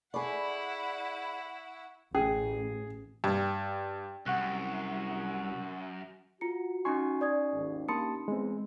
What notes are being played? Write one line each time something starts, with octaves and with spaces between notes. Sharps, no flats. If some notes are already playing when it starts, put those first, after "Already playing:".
E4 G#4 D5 F#5 B5 C#6
A1 C#4 G#4
G2
C2 F#2 F#5 C#6 F#6
F4 F#4 A#5 C#7
C#4 D#4 G#5 C6 C#6 C7
D5 D#6 G#6
G#1 D#2
A#3 D4 G4 A5 B5 C6 D#6 C#7
E2 G#3 C4